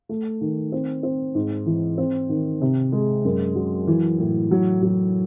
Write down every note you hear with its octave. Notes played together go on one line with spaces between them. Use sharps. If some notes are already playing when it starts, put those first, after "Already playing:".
A3
D#3
C4
C4
G#2
E3
C4
D#3
C3
G#3
F#2
F#3
E3
A2
F#3
F#3